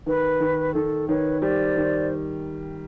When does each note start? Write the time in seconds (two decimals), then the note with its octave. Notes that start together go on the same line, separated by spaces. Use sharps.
0.06 D#3 B4
0.40 D#3
0.74 D#3 A4
1.08 D#3 B4 C#5
1.42 G3 C5 D5
1.77 D#3